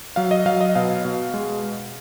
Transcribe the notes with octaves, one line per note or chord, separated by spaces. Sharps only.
F#3 F5
D#5
F#3 F5
D#5
B2 F5
B2
G#3